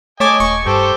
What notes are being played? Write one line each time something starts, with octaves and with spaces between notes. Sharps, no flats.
A3 C#5 D#5 G#5 A5 D6
D#1 C#6
G2 G4 A4 C5